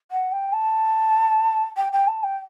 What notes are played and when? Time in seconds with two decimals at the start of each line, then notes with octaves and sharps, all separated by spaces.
0.11 F#5
0.32 G5
0.53 A5
1.77 G5
1.92 G5
2.07 A5
2.23 G5